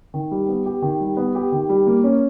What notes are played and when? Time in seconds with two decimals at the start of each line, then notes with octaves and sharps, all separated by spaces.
0.14 D#3
0.31 G3
0.48 B3
0.66 G4
0.82 D#3
1.00 G3
1.17 B3
1.35 G4
1.52 D#3
1.69 G3
1.87 A#3
2.04 C#4